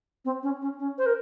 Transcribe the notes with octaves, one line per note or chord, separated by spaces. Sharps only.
C4
C#4
C#4
C#4
C5
A#4